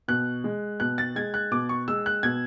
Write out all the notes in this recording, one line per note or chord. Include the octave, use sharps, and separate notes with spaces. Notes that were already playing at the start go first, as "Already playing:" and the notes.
B2 F#6
G#3
B2 F#6
A6
G#3 G#6
F#6
B2 D6
C#6
G#3 E6
F#6
B2 G#6